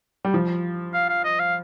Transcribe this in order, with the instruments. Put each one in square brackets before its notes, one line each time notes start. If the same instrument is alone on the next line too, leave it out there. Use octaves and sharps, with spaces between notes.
[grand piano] G3
F3
[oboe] F5
F5
D#5
F5